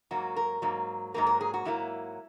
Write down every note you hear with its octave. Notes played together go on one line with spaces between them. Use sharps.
G#2 F#3 A#3 F#4
A#4
G#2 F#3 A#3
G#2 F#3 A#3 A#4
A#4
G#4
F#4
G#2 F#3 A#3 E4